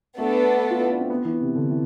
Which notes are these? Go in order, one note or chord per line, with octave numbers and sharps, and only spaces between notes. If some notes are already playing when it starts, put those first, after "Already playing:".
A3 B3 D4 A4
F4
E4
D4
C4
B3
E3
C3
D3
E3